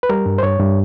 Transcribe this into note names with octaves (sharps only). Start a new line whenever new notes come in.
B4
G3 A#4
G2
C5
G2 C#5
G2